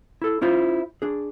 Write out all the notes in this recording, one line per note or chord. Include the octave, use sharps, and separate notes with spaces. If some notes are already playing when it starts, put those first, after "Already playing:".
E4 A4
C#4 E4 F4 C5
D4 G#4